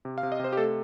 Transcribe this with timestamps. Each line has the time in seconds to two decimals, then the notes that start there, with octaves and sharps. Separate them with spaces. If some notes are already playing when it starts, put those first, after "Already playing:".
0.05 C3
0.18 F5
0.23 C3
0.32 D#5
0.39 C3 C5
0.53 G4
0.57 A3 A4